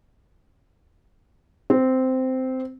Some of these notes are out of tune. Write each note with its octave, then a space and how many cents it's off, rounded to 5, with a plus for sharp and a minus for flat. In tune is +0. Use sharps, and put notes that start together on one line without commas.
C4 -10